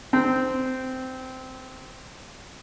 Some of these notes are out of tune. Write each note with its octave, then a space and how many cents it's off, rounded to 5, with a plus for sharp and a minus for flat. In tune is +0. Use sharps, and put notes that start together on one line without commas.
C4 -15